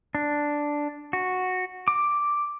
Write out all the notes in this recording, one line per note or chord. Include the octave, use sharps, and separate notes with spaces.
D4
F#4
D6